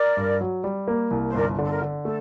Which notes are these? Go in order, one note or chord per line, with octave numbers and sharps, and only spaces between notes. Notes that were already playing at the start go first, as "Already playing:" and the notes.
Already playing: A#4 D5
G2
F#3
G3
A#3
C2
C5
G1 A#4 D5
D3
A4
A#4
D3
A3 A4